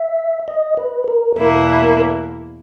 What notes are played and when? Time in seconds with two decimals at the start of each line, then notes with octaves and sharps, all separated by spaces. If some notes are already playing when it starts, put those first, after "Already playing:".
Already playing: E5
0.48 D#5
0.77 B4
1.08 A#4
1.36 E2 B2 A#3 E4 A#4
1.82 A#4